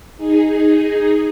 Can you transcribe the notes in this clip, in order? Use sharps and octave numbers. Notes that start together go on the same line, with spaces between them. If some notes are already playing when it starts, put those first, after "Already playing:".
D#4 G#4